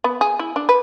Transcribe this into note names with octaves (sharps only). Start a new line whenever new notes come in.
B3
G#4
E4
D4
B4